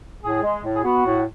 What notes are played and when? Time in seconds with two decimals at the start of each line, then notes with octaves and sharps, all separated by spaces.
0.24 A2 G#4
0.43 G#3
0.64 A2
0.76 G#4
0.84 B3 F#4
1.05 A2